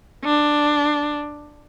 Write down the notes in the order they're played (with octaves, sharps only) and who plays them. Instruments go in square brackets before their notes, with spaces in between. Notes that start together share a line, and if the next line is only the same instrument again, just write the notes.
[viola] D4